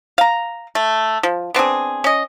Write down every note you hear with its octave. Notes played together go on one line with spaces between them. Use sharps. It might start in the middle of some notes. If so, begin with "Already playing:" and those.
F5 A#5
A3
F3
B3 C4 D4 G#4
C#4 D#5